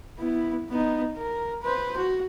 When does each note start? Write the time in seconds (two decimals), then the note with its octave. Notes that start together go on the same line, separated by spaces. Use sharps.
0.18 B3 E4
0.69 B3 D#4
1.17 A#4
1.63 B4 C5
1.98 F#4